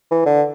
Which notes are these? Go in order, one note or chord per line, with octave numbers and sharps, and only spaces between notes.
E3
D3